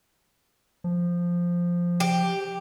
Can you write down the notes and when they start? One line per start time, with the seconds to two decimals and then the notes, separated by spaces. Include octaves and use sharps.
0.84 F3
2.00 G4